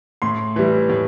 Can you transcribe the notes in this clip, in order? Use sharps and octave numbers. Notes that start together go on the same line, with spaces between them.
A2 C6
E3 G3
A2